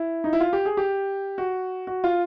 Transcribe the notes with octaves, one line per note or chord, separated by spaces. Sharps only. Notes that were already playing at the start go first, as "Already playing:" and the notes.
Already playing: E4
D#4
E4
F4
G4
G#4
G4
F#4
F#4
F4